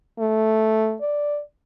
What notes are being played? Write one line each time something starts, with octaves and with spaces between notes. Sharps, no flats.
A3
D5